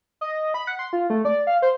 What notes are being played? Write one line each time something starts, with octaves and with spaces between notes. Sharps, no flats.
D#5
B5
F#5
C6
F4
A3
D5
F5
C5